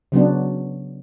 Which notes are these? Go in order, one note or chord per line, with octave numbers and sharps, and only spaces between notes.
C#3 F#3 B3 D4